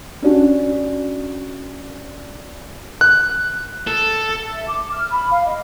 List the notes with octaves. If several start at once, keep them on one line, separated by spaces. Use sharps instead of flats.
C#4 D4 F#4
F#6
A4
E5
D6
F6
B5
F5
D#5